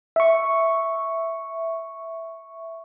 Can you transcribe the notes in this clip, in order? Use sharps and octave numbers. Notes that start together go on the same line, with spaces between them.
E5 C#6